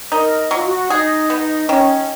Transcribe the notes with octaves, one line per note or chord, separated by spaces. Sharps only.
D#4 A#4
F#3 F4
F#4
D#4 G#4
B3
D#3 C#4